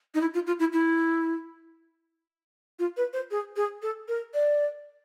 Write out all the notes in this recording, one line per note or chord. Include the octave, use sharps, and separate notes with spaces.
D#4
E4
F4
F4
E4
E4
F4
B4
C5
G#4
G#4
A4
A#4
D5